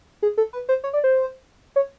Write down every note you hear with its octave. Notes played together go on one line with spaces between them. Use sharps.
G#4
A4
B4
C5
C#5
D5
C5
C#5